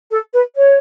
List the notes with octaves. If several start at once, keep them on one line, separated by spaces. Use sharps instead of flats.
A4
B4
C#5